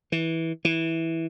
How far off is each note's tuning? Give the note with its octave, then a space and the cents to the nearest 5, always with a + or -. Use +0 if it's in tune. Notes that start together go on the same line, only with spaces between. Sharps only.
E3 -15
E3 -10